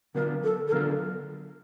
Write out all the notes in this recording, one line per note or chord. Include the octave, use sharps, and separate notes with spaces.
D3 F#3 B3 D4 F4 A#4
A4
A4
D3 F#3 B3 D4 F4 A#4